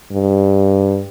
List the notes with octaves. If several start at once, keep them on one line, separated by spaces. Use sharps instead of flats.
G2